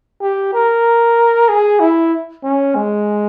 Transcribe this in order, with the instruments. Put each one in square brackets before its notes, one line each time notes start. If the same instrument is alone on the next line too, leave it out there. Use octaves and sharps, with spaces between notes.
[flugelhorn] G4
A#4
G#4
E4
C#4
G#3